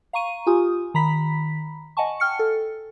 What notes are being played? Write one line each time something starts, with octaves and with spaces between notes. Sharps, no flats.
F5 A#5 C#6 D#7
F4 G4 G#5 D#6
D#3 A#5 B5 B6
D#5 F#5 G#5 A5 C#6
G5 F6 C#7
A4